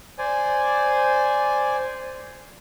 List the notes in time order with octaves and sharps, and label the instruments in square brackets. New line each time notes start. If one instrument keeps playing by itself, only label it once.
[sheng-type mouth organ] C5 D5 G#5